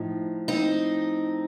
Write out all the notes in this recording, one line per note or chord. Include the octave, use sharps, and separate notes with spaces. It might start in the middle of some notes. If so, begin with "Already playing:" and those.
Already playing: A2 F3 D#4
C4 D#4